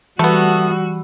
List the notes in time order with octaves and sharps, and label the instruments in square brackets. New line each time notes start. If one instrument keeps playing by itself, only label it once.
[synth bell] E3 [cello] G3 F#4 [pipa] A3 B3